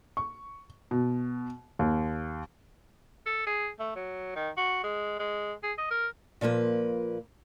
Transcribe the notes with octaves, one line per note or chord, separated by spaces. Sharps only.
C#6
B2
D#2
A4
G#4
A3
F#3
D#3
F#4
G#3
G#3
G#4
D#5
A#4
A#2 F3 A#3 B4